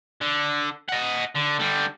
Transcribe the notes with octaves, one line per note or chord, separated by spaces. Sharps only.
D3
D#5 F#5
D3
D3 G3